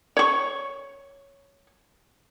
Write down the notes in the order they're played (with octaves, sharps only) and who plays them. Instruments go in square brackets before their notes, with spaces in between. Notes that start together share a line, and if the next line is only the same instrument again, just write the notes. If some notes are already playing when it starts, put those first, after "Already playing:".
[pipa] C#5 C#6